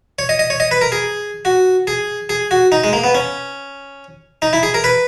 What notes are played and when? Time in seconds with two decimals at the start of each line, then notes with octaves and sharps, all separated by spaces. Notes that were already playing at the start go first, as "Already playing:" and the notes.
0.19 C#5
0.29 D#5
0.39 D#5
0.50 C#5
0.60 D#5
0.71 B4
0.81 A#4
0.92 G#4
1.45 F#4
1.87 G#4
2.29 G#4
2.51 F#4
2.72 D#4
2.84 G#3
2.93 A#3
3.04 B3
3.15 C#4
4.42 D#4
4.53 E4
4.63 G#4
4.74 A#4
4.84 B4